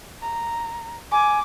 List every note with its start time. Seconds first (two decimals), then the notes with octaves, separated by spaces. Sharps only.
0.22 A#5
1.12 G#5 D6